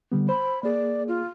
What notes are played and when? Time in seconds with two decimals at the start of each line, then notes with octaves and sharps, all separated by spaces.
0.12 D3 G3 B3
0.29 C5 B5
0.63 A#3 G#4 D5
1.08 F4